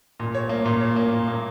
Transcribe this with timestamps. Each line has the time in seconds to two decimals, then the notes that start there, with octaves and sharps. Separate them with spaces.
0.20 A#2
0.34 C#5
0.49 A#3
0.65 A#2
0.81 C#5
0.96 A#3
1.12 A#2
1.27 A#3